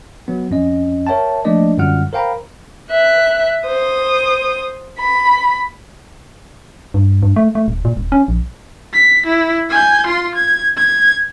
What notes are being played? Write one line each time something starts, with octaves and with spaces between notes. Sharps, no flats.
F#3 B3
F2 C#4 D#5
A#4 C#5 E5 G5 A5
F3 A3 A#3 D4 D5 D#5
F#2 D3 G3 F4 F#5 F6
A#4 C5 F5 G5 A#5 B5
E5 F#6
C5 D#6
B5
G2
G2
A3
A3
D#1
A#2
D#1
C#4
A#1
B6
E4
G#5 G6
F4 C6
G#6
G#6